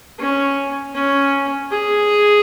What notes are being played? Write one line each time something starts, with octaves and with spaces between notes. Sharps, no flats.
C#4
C#4
G#4